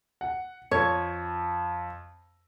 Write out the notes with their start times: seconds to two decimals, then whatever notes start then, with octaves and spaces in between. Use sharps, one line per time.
0.21 F#5
0.71 F2 C#5